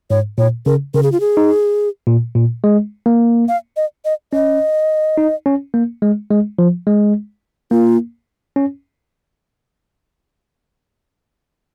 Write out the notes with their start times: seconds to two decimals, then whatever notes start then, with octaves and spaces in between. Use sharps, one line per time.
0.10 G#2 C#5
0.38 A#2 C#5
0.66 C#3 A#4
0.94 C#3 A#4
1.03 G#4
1.12 F4
1.20 G#4
1.37 D#4
2.07 A#2
2.36 A#2
2.64 G#3
3.06 A#3
3.48 F5
3.76 D#5
4.05 D#5
4.33 C#4 D#5
5.18 D#4
5.46 C#4
5.74 A#3
6.02 G#3
6.30 G#3
6.59 F3
6.87 G#3
7.71 A#3 F4
8.56 C#4